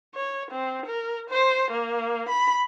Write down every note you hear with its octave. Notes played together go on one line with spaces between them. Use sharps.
C#5
C4
A#4
C5
A#3
B5